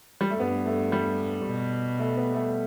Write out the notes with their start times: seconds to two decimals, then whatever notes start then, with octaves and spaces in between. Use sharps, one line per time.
0.21 G3
0.30 A3
0.39 G2 B3
0.66 A3
0.92 G3
1.46 B2
1.99 A3
2.17 B3
2.34 A3